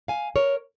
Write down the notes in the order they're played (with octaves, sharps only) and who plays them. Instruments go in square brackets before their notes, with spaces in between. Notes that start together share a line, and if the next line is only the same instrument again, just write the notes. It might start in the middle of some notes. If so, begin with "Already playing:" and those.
[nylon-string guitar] F5 G#5
A#4 C#5